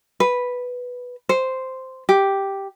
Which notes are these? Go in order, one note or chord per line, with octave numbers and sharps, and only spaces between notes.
B4
C5
G4